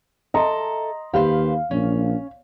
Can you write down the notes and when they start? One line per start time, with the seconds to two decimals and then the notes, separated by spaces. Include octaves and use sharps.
0.34 A4 D#5 E5 A#5 C6
1.14 D#2 G4 B4 C5 F5
1.71 A#1 C#4